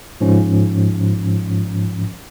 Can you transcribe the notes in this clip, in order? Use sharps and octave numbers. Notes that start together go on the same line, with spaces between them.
G#2 F3 C#4